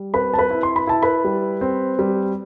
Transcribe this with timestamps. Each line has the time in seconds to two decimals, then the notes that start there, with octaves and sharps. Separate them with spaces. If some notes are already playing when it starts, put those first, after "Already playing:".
Already playing: G3
0.13 C4 B4 B5
0.34 A5
0.38 B4 B5
0.51 E4
0.63 C6
0.76 B5
0.87 E4 A5
1.03 B4 B5
1.24 G3
1.61 C4
1.99 G3